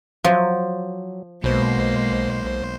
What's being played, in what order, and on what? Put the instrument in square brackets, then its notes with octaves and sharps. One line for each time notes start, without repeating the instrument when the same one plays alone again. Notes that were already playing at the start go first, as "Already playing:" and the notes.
[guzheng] F3 [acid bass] F#3
[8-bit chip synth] B1 C5 [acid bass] B2 [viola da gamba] G#3 A#3